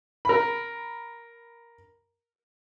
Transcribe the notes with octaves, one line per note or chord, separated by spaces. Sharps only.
A#4 B5